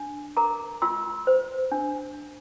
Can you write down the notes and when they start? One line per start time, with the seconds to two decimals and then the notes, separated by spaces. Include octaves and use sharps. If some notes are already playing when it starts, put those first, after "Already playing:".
Already playing: D4
0.37 A#4 A#5 D6
0.82 F4 C6 E6
1.27 C5
1.72 D4